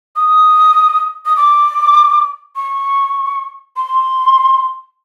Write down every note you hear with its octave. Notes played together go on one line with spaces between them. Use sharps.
D#6
D#6
D6
C#6
C6